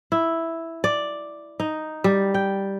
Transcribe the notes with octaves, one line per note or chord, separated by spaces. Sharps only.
E4
D5
D#4
G3
G5